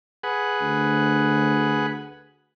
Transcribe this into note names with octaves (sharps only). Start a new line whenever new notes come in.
G#4 B4 F#5
D2